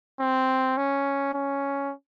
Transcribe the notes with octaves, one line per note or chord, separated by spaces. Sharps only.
C4
C#4
C#4